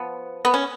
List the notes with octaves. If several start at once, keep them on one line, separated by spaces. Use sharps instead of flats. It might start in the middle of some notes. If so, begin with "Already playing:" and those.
Already playing: F3 B3
B3
C#4